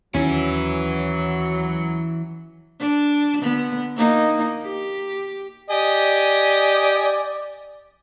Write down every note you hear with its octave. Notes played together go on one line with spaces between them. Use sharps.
D#2 E3 F#3 C#4 E4
D4
D3 B3
A#3 D#4
G4
G4 D5 D#5 G#5